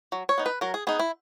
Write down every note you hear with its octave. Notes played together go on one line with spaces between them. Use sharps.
F#3
C#5
B3 D#4
B4
F#3 A#4
G#4
B3 D#4 G#4
E4